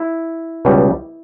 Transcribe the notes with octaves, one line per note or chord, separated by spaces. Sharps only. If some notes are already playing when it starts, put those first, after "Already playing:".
Already playing: E4
C#2 B2 G3